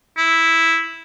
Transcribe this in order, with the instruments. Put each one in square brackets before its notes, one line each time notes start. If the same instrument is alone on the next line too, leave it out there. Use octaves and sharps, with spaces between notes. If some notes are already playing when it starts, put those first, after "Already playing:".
[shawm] E4